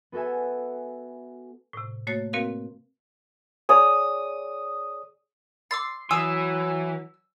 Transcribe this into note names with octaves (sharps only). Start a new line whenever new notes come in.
B3 F#4 A4 E5 G#5
A2 C3
A3 A#3 F#4 C#5 A6
A#3 C4 F#4 A#4 B4 F5
G#4 C#5 D5 D#6
C6 D6 E6 A6
E3 F#3 G#5 D#6 E6 C7